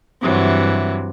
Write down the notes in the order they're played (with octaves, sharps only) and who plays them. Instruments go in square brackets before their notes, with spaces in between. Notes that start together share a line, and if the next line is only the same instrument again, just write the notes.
[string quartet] G2 C3 E3 F#3